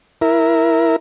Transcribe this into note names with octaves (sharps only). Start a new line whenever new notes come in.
E4 A#4